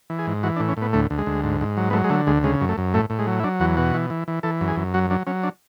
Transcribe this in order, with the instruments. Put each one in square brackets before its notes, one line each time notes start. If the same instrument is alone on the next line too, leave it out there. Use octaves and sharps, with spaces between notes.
[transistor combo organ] E3
G#4
G#2
E3 F#4
D4
A2
C#4
A2
B3
D2 A3
D2
G#3
D2
G#2
G#2
F#3
B3
F#3 A3
G#3
D3 A3
D2 G#3
C#3 G#3
F#2
A3
F#2
A2 A3
A2
G#3
F#3
E4
F#3 D4
E2 F#4
B2 F#4
E3
E3
E3
E3 A4
F#2
G#4
F#2
F#3 F#4
F#3 D4
F#3 C#4
D4